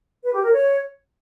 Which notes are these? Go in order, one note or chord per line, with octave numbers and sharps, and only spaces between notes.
B4
G4
A#4
C#5